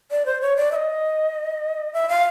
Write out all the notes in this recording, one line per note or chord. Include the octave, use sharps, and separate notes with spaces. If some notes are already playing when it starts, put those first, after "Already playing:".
D5
C5
C#5
D5
E5
D#5
E5
F5